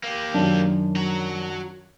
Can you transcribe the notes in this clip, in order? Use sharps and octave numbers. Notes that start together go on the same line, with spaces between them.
A#3 G4
F#2 D#3 D4
F#4 A#5